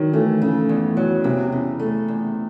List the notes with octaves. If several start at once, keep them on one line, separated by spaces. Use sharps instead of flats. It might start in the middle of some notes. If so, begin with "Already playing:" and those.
Already playing: D#3 F#3
E3 A3
C#3 A3
E2
F#3
E2 C3
C#3
A3
E2